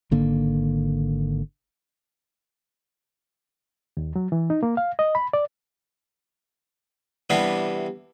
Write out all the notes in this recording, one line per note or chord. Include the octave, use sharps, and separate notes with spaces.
G#1 D3 A#3
D#2
F#3
E3
D#4
A#3
F5
D#5
B5
D5
C3 E3 G3 B3 D4